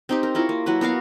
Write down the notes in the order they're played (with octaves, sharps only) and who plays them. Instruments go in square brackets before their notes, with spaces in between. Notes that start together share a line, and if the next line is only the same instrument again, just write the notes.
[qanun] C4 D#4 G4
A#4
E4 F4 A#4 C#5
A#3
F#3 A#3 E4 B4
B3 F#4 A#4 F5